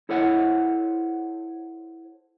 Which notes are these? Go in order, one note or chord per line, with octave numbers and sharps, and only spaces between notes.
E4 A4 C5 C#5 F#5